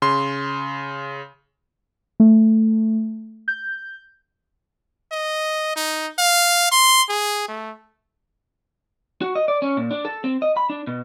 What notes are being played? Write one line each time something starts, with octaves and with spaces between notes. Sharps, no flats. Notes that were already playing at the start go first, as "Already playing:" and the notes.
C#3 C6
A3
G6
D#5
D#4
F5
C6
G#4
A3
F#4
D#5
D5
C#4
A#2
D4
A4
C4
D#5
B5
D4
B2